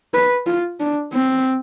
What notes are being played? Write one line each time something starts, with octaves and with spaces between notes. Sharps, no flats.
B4
F4
D4
C4